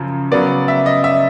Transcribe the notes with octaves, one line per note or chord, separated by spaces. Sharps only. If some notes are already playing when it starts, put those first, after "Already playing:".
Already playing: F#2 C#3 F3
C#3 F#3 B3 D5
E5
D#5
E5